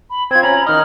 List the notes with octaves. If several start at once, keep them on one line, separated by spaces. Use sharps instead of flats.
B5
C4 F4 G#6
C#4 A#5 B5
D#3 D#4 D#5 F6